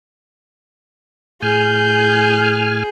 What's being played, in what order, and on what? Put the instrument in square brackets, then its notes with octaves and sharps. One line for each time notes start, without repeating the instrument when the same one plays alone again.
[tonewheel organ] A2 G#5 F6 [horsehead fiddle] G#4 [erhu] G6